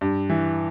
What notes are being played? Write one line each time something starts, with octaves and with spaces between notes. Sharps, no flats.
G2
E3